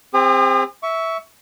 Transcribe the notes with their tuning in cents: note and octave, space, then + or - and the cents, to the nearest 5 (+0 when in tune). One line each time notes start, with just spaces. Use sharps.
C4 +0 G#4 -45 D#6 -35
E5 -10 C#6 +20